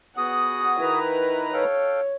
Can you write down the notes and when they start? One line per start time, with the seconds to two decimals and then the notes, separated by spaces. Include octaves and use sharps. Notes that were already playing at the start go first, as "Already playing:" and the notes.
0.17 B3 F#4 G#4 F#5 D#6
0.80 D#3 E4 B4 A#5
1.54 A4 C#5 F5 G5